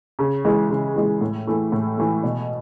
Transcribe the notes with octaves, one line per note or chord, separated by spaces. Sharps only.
C#3
E3 G#3
C#3
E3 G#3
A2
E3 A3
A2
E3 A3
B2